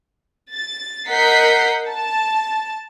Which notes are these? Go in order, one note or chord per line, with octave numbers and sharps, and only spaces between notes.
A6
A#4 D#5 F#5 G6 B6 C7
A5